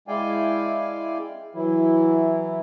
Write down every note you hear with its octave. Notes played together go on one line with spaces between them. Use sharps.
G#3 E4 D5 F5 G5 G#5
E3 F#3 E4